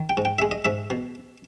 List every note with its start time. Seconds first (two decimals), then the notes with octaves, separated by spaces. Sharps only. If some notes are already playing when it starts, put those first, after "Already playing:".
Already playing: D#3
0.09 G5
0.17 G#2
0.25 G5
0.39 G#3 E5
0.51 D#5
0.65 G#2 E5
0.90 B2